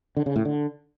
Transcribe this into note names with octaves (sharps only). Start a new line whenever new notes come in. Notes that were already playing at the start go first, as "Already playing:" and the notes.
D3
C#3
A2
D3